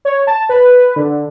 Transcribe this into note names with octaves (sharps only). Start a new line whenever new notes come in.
C#5
A5
B4
D3